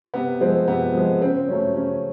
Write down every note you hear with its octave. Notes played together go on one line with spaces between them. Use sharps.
C3 B3
F3 G#3 C4
C3 B3
F3 G#3
C#3 C4
F#3 A3 C#4
C#3 C#4